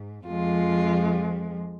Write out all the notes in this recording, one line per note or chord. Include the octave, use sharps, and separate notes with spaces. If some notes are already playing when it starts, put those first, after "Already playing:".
Already playing: G#2
F2 F3 G#3 F4